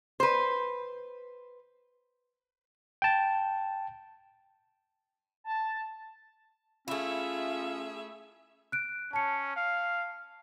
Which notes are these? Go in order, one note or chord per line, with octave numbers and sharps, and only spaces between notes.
B4 C5
G5 A5
A5
A3 C#4 E4 F4 G#4 E5
F#6 D7
C#4 A5 C#7
F5